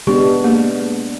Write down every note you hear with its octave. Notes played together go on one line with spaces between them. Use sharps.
G#3 B3 D4 G4
A#3